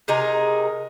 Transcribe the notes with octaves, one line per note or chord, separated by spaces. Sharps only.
C3 D#4 G#4 A#4